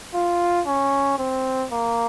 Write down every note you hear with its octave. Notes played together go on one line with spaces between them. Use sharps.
F4
C#4
C4
A#3